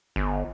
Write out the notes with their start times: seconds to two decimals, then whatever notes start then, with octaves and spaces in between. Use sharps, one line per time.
0.16 G1